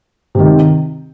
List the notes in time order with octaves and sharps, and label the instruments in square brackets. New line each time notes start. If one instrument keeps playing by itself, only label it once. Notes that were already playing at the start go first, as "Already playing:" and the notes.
[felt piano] C3 D#3